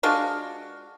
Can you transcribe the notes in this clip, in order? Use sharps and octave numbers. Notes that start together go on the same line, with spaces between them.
G#3 D4 F4 F#4